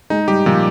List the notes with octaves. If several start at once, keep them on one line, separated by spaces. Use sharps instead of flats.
G#3 D#4
G3 G4
A#2 F3